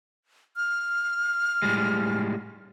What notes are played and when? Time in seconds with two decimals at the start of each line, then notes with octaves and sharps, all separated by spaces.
0.57 F6
1.62 A2 G3 G#3